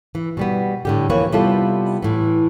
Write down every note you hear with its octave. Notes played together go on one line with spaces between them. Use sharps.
E3
B2 G3 B3
A2 D3 G4
F2 E3 A#3 B4 C#5
C3 G3 B3 E4 F4 A4
A2 E3